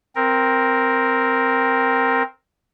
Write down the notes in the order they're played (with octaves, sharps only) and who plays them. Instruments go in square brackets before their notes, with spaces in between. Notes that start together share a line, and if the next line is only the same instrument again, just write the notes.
[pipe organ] C4 A#4